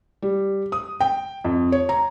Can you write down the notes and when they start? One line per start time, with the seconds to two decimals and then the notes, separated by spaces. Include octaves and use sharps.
0.22 G3
0.72 D#6
1.00 G5
1.44 F2
1.72 C#5
1.89 A#5